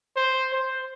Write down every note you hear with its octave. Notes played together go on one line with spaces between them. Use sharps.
C5
C5